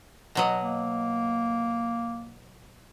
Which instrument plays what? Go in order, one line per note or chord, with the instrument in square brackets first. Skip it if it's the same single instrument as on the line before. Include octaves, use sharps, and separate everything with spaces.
[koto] B2 F#3 D#5
[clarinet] A#3